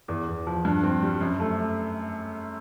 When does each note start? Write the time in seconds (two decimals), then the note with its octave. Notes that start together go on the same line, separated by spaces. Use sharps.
0.08 E2
0.28 E2
0.47 F3
0.65 G2
0.83 C4
1.02 G3
1.21 F#2
1.40 A3